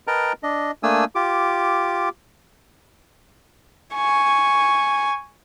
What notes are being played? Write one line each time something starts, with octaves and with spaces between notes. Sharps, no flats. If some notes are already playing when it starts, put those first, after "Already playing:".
A#4 B4 D#5 G5 A5 A#5
D4 D#5
A3 A#3 D4 G#5 D#6 E6
F4 G4 D6
G#5 C#6